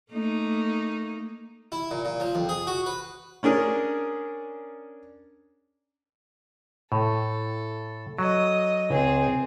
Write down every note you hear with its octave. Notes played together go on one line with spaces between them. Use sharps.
A3 A#3 D#4
E4
A#2
A#2
F3
F2
G#4
F#4
B4
C#4 D4 G#4 A#4
A2 A4
F#3 D#5
C#2 C4 G#4